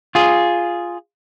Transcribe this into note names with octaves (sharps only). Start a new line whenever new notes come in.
F4 G#4